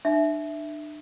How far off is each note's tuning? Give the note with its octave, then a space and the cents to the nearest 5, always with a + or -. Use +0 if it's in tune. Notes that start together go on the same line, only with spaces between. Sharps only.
D4 +40 E5 +0